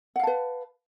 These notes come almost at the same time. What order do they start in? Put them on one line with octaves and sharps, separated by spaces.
F#5 F5 A5 B4